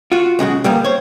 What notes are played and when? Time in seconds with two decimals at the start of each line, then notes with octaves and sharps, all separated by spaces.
0.12 F4 F#4
0.39 B1 C#3 G#3 F#4
0.64 A#2 G3 A#3 B3
0.84 C5 C#5